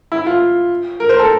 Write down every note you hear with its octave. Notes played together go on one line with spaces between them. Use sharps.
E4
F4
A#4
C5
A4